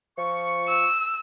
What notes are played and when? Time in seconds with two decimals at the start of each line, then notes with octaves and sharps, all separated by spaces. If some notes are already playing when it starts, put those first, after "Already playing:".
0.17 F3 C#6
0.68 E6